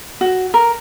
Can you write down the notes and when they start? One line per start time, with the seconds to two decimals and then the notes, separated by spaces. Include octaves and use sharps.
0.21 F#4
0.54 A#4